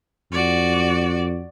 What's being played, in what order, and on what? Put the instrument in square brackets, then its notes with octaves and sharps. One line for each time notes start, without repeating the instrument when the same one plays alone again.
[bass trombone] F2 [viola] F#4 D5